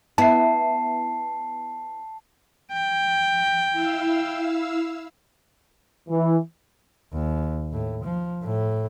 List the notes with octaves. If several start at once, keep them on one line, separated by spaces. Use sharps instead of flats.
B3 E4 A5 C7
G5
E4 F5 E6
E3
D#2
A2
F3
A2